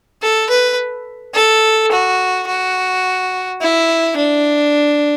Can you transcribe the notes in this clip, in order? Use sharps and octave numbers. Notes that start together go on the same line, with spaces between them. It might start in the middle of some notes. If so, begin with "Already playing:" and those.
A4
B4
A4
F#4
F#4
E4
D4